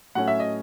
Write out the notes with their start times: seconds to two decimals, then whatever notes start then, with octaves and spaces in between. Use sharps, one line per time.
0.15 A2 F#3 A3 C#4 F#5
0.28 E5
0.40 D#5